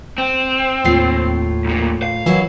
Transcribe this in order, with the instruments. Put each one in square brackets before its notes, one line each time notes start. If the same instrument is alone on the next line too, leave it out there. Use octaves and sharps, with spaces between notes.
[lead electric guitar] C4
[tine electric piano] D#2 C7 [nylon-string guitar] A2 F4 G5
[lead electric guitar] B1 A#2
F5
[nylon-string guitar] D#3 F#3 E4 [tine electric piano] E3